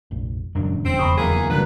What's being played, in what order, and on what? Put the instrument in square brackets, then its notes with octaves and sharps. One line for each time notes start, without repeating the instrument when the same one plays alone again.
[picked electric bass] F1 A#1
[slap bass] D#1 C#2 D4 [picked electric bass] F#2
[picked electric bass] E1 F2 [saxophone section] C4
[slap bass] F#1 E2 B3 [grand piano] B5 C#6 D#6
[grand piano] D1 A#3 [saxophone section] E3 G#4
[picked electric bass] G1 B2 D3 [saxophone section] D2 B4 [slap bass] G2 E3 G3